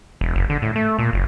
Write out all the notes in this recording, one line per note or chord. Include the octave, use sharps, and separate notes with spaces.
E1
F#1
D3
A2
A3
A#2
F#1